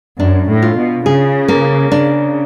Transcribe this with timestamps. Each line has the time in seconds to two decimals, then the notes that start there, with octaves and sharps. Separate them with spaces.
0.20 F#2 D4
0.49 A2
0.62 F4
0.77 B2
1.05 C#3 G#4
1.48 A#3
1.91 C#3 D4